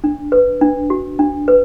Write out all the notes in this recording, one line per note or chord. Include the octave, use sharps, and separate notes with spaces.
D4
B4
D4
F#4
D4
B4